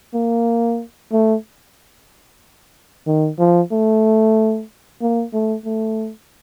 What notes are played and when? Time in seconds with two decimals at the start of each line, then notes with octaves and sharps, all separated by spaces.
0.14 A#3
1.12 A3
3.07 D#3
3.39 F3
3.72 A3
5.01 A#3
5.33 A3
5.65 A3